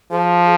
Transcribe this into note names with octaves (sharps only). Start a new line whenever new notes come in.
F3 G#4